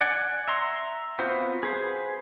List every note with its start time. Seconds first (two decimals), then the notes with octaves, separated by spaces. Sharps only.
0.01 D5 F#5 G#5
0.48 E5 A#5 C6
1.19 B3 C4 F4 F#4 C5
1.63 G#4 B4 C5